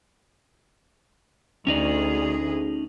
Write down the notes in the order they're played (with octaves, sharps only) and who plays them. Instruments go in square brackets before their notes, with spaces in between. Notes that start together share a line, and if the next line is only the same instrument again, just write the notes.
[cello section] D2 G#4 [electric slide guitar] C#4 D#4 D5